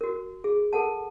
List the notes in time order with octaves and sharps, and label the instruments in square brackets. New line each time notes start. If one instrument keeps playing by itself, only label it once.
[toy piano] F#4 A#4
G#4
A4 A#4 F#5 A5